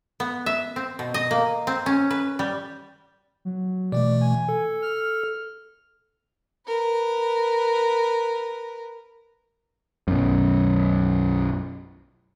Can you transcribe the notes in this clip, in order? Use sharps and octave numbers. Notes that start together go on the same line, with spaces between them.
B3
E5
C4
B2
D#5
A#3
C4
C#4
B4
G3
F#3
B2 E3 A3 D5
G#5
A4
F6
A#4 B4
B1 F#2